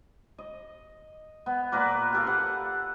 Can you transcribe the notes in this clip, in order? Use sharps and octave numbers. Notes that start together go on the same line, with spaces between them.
D#5
B3
A#2 A#4 B4 D6
G4 A4 F5
B4 F#5